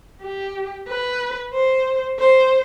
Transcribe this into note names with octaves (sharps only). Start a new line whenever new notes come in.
G4
B4
C5
C5